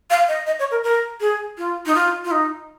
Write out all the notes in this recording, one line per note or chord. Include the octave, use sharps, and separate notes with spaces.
F5
D#5
D#5
C#5
A#4
A#4
G#4
F4
D#4
F4
F4
D#4